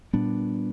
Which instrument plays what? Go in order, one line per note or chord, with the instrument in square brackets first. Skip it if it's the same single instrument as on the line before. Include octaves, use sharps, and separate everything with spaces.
[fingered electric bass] A#2 G3 B3 D4